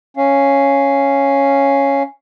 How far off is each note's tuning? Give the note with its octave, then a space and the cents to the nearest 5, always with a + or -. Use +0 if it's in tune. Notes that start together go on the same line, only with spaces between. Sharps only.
C#4 +0 F5 -15